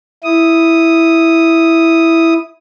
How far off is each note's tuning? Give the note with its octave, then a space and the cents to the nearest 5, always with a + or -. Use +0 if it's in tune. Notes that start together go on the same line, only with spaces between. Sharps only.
E4 +0 D#6 +0